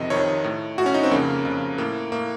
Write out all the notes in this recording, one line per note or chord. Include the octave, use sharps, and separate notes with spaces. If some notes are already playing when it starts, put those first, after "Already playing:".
Already playing: F2 C3 D#3 D#5
F2 C3 D#3 C#5
A2
A2 F#4
C#4
D#4
C4
F2 C#3 A#3
F2 C#3
A2 A#3
A2 A#3